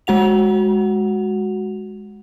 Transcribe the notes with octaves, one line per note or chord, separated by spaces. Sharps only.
G#3 F#4 F#5 F7